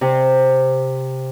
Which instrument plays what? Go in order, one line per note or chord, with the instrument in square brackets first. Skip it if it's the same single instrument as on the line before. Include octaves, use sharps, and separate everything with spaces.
[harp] C3